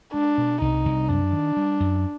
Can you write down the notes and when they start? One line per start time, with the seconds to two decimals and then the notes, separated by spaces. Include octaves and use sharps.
0.14 G#3 D4
0.38 B2
0.61 C2 D#4
0.85 C2
1.08 F#2 D4
1.32 D#3
1.57 G3
1.80 F#2